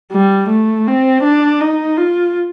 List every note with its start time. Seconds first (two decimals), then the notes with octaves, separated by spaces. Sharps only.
0.12 G3
0.49 A3
0.87 C4
1.23 D4
1.61 D#4
1.97 F4